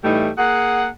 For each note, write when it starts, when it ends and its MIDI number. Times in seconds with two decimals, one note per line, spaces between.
0.04 0.29 45
0.04 0.29 52
0.04 0.29 55
0.04 0.29 57
0.04 0.29 63
0.38 0.87 58
0.38 0.87 68
0.38 0.87 78